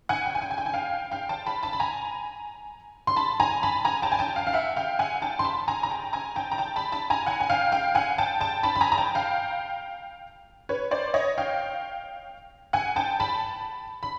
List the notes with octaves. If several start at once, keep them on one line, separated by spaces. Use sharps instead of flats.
F#5 G#5
G5
G#5
G5
G#5
G5
G#5
F5 G5
F5 G5
G5 A5
A5 B5
A5 B5
B5
G#5 A#5
C6
A5 B5
G#5 A#5
A5 B5
G#5 A#5
G5 A5
G#5
G5 A5
F5 G5
F5
E5 F#5
F5 G5
F#5 G#5
G5 A5
C6
A5 B5
G#5 A#5
A#5
G5 A5
G#5 A#5
G5 A5
A#5
G5 A5
A5 B5
A5 B5
G#5 A#5
F#5 G#5
G#5
F5 G5
F5 G5
F#5 G#5
G5 A5
G5 A5
A5 B5
B5
G#5 A#5
A#5
G5 A5
F5 G5
B4 C#5
C5 D5
C#5 D#5
F5 G5
F#5 G#5
G5 A5
A5 B5
B5